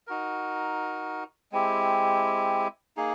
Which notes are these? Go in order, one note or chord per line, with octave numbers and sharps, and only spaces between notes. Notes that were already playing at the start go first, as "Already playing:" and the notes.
D#4 F#4 A#4
G#3 C4 E4 G4
A#3 D#4 G#4